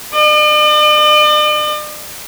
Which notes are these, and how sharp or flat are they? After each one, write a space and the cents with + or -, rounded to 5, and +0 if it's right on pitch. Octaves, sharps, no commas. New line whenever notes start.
D5 +45